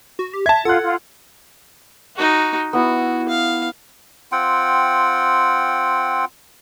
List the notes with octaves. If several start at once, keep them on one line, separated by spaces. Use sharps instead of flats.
F#4
G4
E5 A5 G#6
F4 A4 F#5 F#6
F4
D#4 F#4
B3 E4 F#4
F5
C4 F4 F#5 G5